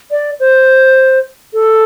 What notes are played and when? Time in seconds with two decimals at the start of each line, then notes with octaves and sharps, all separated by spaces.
0.11 D5
0.40 C5
1.54 A4